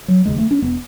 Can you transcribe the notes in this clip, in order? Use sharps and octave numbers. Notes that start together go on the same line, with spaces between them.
F#3
E1 D#2 C#3 G#3
A3
C#4
E1 B2 B3